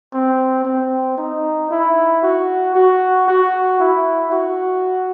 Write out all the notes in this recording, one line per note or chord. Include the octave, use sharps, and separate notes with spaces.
C4
C4
D#4
E4
F#4
F#4
F#4
E4
F#4